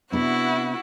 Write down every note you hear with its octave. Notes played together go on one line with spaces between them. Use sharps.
C3 B3 D4 E4 F#4 F#5